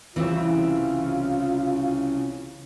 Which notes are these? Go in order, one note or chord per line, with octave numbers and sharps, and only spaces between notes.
C2 C#3 E3 C4 F4